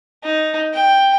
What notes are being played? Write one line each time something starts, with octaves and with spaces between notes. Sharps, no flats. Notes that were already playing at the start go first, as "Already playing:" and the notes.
D#4
G5